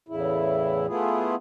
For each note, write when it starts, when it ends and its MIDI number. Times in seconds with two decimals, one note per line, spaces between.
0.09 0.87 40
0.09 0.87 45
0.09 0.87 49
0.09 0.87 64
0.88 1.35 57
0.88 1.35 59
0.88 1.35 64
0.88 1.35 65
0.88 1.35 68